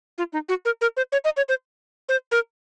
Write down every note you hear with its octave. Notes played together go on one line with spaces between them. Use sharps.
F4
D#4
F#4
A#4
A#4
C5
C#5
D#5
C#5
C5
C5
A#4